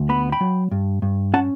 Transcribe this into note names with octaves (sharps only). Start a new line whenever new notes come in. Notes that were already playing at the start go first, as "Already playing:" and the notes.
Already playing: D2
B3 B5
G5 B5
F#3
G2
G2
C#4 F#5 A5